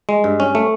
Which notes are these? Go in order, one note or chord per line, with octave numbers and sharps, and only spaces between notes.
G#3
G2
C#4
A3